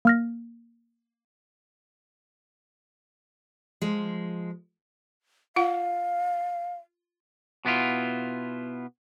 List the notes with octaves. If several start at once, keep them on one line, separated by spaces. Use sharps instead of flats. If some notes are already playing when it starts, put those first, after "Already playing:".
A#3 F6 A#6
F3 G#3
F4 F5 F#5
B2 B3 E4 F4